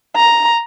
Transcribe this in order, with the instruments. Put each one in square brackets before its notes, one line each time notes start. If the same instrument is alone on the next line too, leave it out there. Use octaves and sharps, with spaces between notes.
[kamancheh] A#5